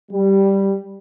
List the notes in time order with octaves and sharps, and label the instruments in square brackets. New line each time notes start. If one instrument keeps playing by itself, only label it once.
[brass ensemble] G3